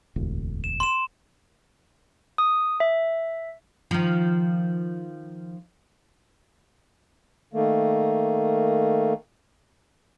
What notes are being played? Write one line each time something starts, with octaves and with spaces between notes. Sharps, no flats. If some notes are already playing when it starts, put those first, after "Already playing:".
E1 A1 D2
E7
C6 E7
D#6
E5
D#3 F3
D#3 A3 A#3